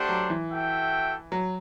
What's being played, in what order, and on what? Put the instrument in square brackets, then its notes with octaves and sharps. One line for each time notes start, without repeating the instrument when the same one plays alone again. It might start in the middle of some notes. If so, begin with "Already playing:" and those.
Already playing: [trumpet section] A3 D4 G4 C5 F#5
[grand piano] F#3
E3
[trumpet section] F#4 A4 E5 G5
[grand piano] F#3